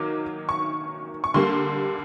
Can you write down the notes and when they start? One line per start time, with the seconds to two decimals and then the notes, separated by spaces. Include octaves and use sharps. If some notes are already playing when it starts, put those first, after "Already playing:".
Already playing: D#3 F#3 A#3 D6
0.49 C#6
1.24 C#6
1.34 D3 G3 A#3 C6